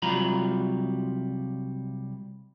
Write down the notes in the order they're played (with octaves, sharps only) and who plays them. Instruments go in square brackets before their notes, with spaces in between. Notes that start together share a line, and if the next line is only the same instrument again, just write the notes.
[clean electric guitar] C2 F#3 G3 F4 A#5 B5